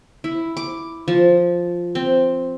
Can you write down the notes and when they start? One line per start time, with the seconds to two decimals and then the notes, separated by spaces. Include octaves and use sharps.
0.24 E4
0.57 D6
1.08 F3
1.95 C4